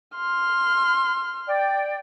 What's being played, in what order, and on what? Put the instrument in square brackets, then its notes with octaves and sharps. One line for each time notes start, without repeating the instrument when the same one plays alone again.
[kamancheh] C6 F6
[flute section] D5 G5